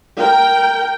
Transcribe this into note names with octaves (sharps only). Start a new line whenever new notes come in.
A#4 G5